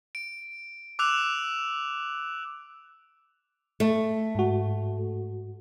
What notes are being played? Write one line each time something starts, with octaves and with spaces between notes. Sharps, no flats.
D7
D6 E6 F#6 F7
A3
G#2 F#4